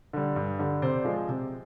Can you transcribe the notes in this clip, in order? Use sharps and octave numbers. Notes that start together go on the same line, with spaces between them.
D3 G3
G2
D3 G3
C3 C5 D5
F3 G#3
C3